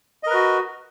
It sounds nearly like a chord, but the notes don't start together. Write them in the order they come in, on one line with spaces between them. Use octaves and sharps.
D#5 A#4 B4 F#4